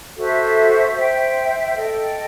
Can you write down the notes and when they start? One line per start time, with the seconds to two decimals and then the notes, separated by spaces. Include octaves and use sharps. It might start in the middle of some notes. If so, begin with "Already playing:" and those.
0.16 F#4 A4 C5 E5
0.97 C5 E5 G5
1.76 A4 D#5 G5